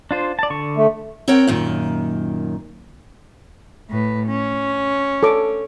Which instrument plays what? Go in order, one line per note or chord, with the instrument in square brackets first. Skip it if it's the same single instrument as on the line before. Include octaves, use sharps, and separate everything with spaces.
[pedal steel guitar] D4 F4 C5
D5 A5
D3 C#6
[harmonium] A3
[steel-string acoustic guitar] C4 A#4 C#5 F#5 G5
F#2 A#2 D#3
[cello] A2 B4
C#4
[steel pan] A4 C#5 D6